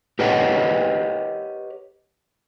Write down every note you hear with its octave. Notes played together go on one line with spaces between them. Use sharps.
G4 A#4 B4 C#5 D#5 F#5